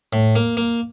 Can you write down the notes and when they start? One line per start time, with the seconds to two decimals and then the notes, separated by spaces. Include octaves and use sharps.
0.13 A2
0.36 A#3
0.57 A#3